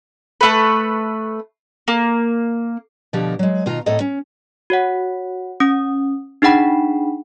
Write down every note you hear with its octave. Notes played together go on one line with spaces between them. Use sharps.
A3 B4
A#3
B2 D3 F3 G4 A#4
F#3 G#3
B2 D#3 F4 A#5
A2 C4 A4 D#5 A#5
C#4
F#4 C#5 F#5
C#4 D#6
D4 D#4 G#4 F#5 G5 B5